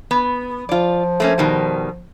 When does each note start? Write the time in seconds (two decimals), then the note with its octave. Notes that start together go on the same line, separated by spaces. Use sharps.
0.11 B3
0.69 F3 F4 D5
1.20 A3 A#3 C#4
1.38 B2 D#3 G3